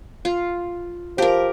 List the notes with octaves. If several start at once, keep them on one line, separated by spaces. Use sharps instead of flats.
F4
F3 G4 A#4